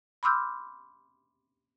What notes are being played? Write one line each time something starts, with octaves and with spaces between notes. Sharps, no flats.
B5 C6 D6 E6 F6 G6